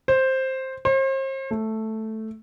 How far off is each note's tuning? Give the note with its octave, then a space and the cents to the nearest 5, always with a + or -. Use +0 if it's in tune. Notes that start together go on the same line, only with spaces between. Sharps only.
C5 +5
C5 +40
A3 +0